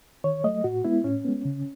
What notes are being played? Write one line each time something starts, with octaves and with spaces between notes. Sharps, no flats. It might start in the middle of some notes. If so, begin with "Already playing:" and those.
D#3 C#5
F#3 A3 D#5
A2 F#4
G#3 B3 E4
A2 C#4
G#3 B3
C#3